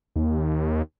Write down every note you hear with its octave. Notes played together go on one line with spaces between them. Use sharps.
D#2